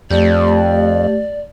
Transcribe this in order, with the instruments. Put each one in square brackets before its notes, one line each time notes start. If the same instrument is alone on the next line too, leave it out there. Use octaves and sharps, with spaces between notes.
[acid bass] F2 [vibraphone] A3 G4 [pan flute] D5